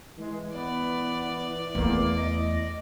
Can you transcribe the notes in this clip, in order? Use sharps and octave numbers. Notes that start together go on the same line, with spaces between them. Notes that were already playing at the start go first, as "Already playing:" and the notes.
E3 G#3
B3 D5
E2 A3 A#3
D#5